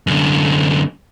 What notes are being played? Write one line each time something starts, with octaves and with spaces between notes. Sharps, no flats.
F#2 D3